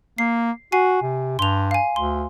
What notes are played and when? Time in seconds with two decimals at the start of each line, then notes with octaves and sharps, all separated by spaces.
0.18 A#3 C7
0.72 F#4 G#5 C7
1.02 C3
1.39 G2 C6 F7
1.71 F5 G#5
1.96 D2 C6